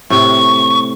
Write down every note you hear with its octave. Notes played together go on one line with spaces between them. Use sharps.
A2 C3 C#6